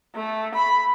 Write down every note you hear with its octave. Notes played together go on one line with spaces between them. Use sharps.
A3
B5